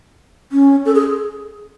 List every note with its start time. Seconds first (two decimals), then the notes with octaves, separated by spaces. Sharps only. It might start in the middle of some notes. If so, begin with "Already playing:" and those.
0.52 C#4
0.86 A4
0.95 G#4